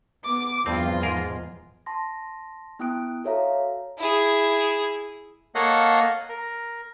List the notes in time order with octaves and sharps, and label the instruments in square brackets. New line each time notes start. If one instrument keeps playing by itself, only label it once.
[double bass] B3 [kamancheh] D6
[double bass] E2 F3 [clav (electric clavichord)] G2 C4 [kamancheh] F4
[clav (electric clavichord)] G#2 G#4 A#4
[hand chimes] A5 C6 A#6
B3 E4 G5 D#6 F#6 D7
F#4 A4 C#5 E5 F5 A#5
[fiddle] E4 G#4
[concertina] A#3 A4 C#5 D#5 F5 F#5
A#4